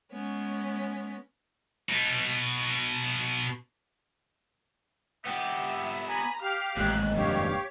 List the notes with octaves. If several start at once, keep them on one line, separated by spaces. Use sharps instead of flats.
G#3 B3 C#4 C#5
B2 D#4
B3 G4 E5
G#5 A#5 B5
G4 F5 F6
A1 D#2 G#2 F#6
F1 G2 G4 C#5 F5